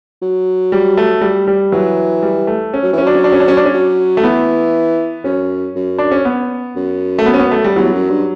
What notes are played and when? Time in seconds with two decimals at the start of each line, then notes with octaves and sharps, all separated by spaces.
0.22 F#3
0.72 G3
0.97 A3
1.21 G3
1.47 G3
1.72 E3 F#3
2.23 G3
2.47 A3
2.74 C#4
2.83 F#3
2.93 E3
2.98 C#4
3.02 F#3 D4
3.14 C#4
3.24 D4
3.32 C#4
3.40 D4
3.48 C#4
3.57 D4
3.65 C#4
3.74 F#3
4.17 A3
4.23 E3 B3
5.24 F#2 C#4
5.76 F#2
5.98 D4
6.12 C#4
6.25 B3
6.76 F#2
7.19 A3
7.26 B3
7.34 C#4
7.39 B3
7.51 A3
7.64 G3
7.76 E2 F#3
7.93 F#2
8.10 G2